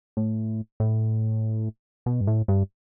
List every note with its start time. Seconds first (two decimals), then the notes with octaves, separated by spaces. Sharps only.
0.17 A2
0.80 A2
2.06 B2
2.21 G2
2.27 A2
2.48 G2